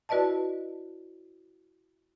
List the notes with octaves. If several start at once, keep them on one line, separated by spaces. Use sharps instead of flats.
E4 F#4 B4 D5 D#5 A5